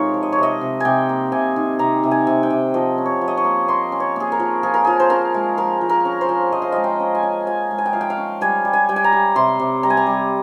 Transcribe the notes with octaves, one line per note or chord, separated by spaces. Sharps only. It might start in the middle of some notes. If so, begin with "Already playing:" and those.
Already playing: C3 G#3 D#4 F4 A#4 C#5
F3
D#5
C#5
C3 D#5
C3
C3 G5 G#5
A#3
C3 G#5
D#3
C3 A#5
C3
G#5
C3
G5
C3
F3 D#5
C#4
C#5
F3
D#5
C#5
A#3
A#3 C6
C#4
C#5
A#3 G#4
A#4
F3
F3 G#4
A#4
F3 G#4
C5
C#4 A#4
G#3
F3 A#4
F3
A#4
C#4
C5
F3
F3 D#5
F5
G#3 D#5
G5
C#4
G#5
C#4
F3 G#5
G#3
G#5
G5
F3 F5
G5
F5
C#4
G3 G#5
G3
G#5
G3 G5
G#5
A#5
G3
C3 C6
C3
G3 A#5
G#5
A#5
G3